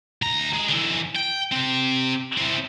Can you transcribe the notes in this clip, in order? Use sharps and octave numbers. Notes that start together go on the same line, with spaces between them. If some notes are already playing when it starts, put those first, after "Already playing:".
D2 A#5
G#3
D3 E3
G5
C4 G4
C4 E4